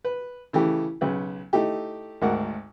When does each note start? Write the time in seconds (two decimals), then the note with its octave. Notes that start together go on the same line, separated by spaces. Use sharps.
0.04 B4
0.53 C#3 E3 A3 G4
1.01 B1 C#3 B4
1.53 A3 D#4 E4 G4
2.22 G#1 D2 A#4 F#5